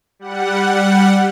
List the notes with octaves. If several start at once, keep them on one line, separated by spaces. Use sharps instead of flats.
G3 F#5